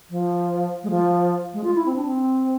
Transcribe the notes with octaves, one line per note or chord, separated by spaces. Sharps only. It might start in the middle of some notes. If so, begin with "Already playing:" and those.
F3
G#3
F3
G#3
F4
E4
C4
D4
C4